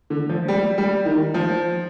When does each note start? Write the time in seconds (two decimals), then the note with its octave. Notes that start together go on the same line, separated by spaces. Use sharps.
0.10 D3
0.29 F3
0.48 G3
0.78 G3
1.05 D#3
1.34 F3